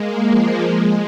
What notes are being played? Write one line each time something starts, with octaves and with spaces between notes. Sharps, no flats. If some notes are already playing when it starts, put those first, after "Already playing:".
Already playing: G#3 A#3
F3
G#3